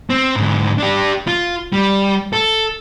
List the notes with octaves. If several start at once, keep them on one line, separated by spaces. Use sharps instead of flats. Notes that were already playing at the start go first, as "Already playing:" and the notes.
C4
G#2 D3
D4 G4
F4
G3
A4